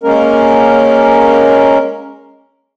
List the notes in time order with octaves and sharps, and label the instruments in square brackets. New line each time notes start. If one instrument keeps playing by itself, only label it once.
[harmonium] G#3 A#3 C#4 A#4